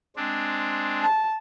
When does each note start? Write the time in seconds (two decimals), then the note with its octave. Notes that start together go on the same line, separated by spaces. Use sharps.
0.16 G#3 C4 D4
1.01 A5